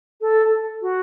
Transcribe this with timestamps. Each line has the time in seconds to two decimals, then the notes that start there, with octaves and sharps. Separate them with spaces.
0.21 A4
0.82 F#4